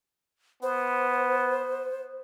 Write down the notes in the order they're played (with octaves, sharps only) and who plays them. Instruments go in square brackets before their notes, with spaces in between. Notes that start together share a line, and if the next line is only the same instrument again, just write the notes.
[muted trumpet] B3 [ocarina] C5